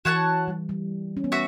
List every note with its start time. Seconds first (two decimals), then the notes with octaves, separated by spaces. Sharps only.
0.05 E3 F#4 C#5 F#5 A5
0.48 G3
0.69 G3
1.17 C#4
1.24 B3
1.32 F#4 E5